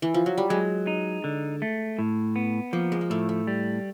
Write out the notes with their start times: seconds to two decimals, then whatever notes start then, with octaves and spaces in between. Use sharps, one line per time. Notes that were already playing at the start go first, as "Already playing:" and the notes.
0.02 E3
0.14 F3
0.26 F#3
0.38 G3
0.50 F#3 G#3
0.87 D#4
1.24 D3
1.62 A3
1.99 A2
2.36 B3
2.73 F3 A#3
2.92 G#3
3.01 A#3
3.10 A2 A3
3.29 A3
3.47 G3